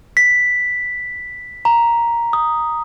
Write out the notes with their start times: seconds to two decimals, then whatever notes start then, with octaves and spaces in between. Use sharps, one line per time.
0.17 B6
1.65 A#5
2.33 D#6